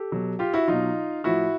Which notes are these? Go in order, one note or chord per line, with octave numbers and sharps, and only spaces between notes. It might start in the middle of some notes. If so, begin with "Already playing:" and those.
Already playing: G4 A4
B2 F#3
F4 G4
E4 F#4
B2 F#3 D#4 F4
A2 F3 E4 F#4